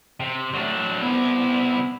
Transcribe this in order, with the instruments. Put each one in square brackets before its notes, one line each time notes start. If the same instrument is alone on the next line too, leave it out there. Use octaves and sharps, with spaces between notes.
[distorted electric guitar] C3
[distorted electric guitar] F#3 D4 [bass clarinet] A3
[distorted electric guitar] C3 E4 [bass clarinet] B3